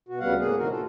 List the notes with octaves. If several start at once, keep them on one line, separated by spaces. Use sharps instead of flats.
B2 F#4
D2 C#3 G3 B3 F5 F#5
A2 A#3 G#4
A2 C3 D#3 A#3 F#4 A#4
A2 F4 A4